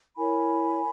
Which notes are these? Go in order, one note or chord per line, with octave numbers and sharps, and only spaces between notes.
E4 A#4 C#5 G#5 B5